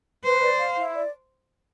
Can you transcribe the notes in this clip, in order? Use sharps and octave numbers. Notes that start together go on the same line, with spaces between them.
B4 C5
D5
F5
E4
D5